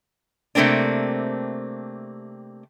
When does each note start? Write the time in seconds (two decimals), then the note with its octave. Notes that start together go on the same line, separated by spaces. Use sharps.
0.55 C3 A3 A#3 C4 D4